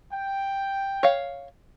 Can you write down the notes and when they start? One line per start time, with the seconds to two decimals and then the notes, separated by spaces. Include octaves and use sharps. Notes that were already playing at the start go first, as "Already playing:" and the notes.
0.12 G5
1.03 C#5 F5